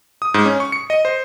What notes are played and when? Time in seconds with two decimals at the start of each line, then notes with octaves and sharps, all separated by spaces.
0.22 D#6
0.34 G#2
0.45 C#4
0.60 C#6
0.72 C#7
0.90 D#5
1.05 C5